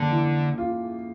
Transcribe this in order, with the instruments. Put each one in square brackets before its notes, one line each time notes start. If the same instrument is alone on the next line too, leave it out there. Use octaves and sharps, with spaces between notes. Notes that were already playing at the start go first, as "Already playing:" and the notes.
Already playing: [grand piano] F2 A#3 [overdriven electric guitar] D3
[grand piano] E3
F4